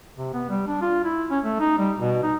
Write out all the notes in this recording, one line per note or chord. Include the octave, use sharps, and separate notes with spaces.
C3
B3
G3
D4
F4
E4
C#4
A3
D#4
G3
B2
D#4